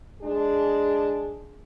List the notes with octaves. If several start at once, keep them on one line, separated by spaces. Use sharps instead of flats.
G#3 D4 G#4